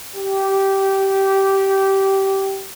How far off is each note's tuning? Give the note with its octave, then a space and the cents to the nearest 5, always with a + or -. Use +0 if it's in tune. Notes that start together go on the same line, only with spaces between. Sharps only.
G4 -15